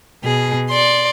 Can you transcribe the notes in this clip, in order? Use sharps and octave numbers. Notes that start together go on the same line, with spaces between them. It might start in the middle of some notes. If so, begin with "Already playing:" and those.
B2 G#4
D5 C6